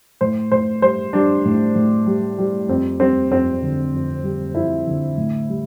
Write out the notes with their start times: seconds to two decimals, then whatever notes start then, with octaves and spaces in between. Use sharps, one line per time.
0.21 A2 C5
0.52 A2 C5
0.82 G3 C5
1.13 G3 D4
1.45 A2
1.75 A2
2.06 G3
2.38 G3
2.68 F2 C4
3.00 G3 C4
3.30 F2 C4
3.62 D3
3.94 F2
4.24 G3
4.55 F2 E4
4.87 D3
5.17 A2
5.49 G3